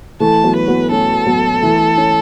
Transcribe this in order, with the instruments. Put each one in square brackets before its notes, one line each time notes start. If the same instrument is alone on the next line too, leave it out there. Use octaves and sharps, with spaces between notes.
[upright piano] E3 A3 [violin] A5
[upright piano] F#3 B3
[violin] B4
[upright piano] F#3 B3
[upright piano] A3 C#4 [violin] A4
[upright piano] F#3 B3
E3 A3
C#4